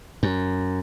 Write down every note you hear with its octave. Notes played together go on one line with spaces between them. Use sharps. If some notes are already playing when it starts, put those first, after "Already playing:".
F#2